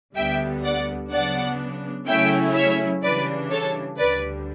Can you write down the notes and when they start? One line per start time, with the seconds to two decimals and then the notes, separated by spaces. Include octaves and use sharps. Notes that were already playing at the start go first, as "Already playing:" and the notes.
0.16 D2 D3 G3 B3 E5 G5
0.63 D5 F#5
1.11 C#3 F#3 B3 D4 D5 F#5
2.07 C#3 F#3 A3 C#4 E4 E5 G5
2.55 C#5 E5
3.03 C#3 E3 G3 D4 B4 D5
3.51 A4 C#5
3.99 D2 D3 G3 B4 D5